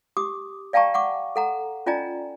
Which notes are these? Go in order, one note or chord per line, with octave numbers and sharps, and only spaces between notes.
G4 D6 D#6
D5 F5 G5 A5 A#5 C#6
F#5 C#6 D6
A4 F#5 A#5
C#4 F4 D5 D#5 G#5 A#5